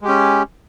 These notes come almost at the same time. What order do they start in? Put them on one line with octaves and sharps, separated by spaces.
G#3 G4 C#4